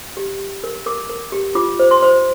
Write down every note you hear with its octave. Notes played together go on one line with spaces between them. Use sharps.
G4
G4
A#4
A#4 D6
A#4
G4
F4 D6
C5
C6
C5